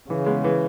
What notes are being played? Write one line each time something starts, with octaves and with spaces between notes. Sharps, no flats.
C#3 E3
G#3 B3
E3